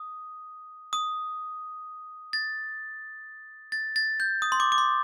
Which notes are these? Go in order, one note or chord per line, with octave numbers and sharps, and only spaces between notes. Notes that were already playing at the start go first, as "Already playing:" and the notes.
Already playing: D#6
D#6
A6
A6
A6
G6
D#6
C6
D6
D6
C6